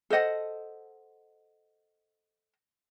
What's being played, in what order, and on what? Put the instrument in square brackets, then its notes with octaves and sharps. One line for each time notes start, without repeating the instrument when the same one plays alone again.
[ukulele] A4 C5 D#5 F#5